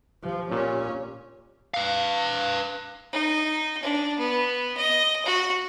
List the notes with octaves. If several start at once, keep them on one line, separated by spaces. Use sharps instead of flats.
F3 G4
A#2 C#4
B4 F5
D#4
D4
B3
D#5
F#4